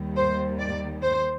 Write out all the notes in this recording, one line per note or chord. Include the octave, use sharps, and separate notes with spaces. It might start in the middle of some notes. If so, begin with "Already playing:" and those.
Already playing: D#2 D#3 G3
C5
D5
C5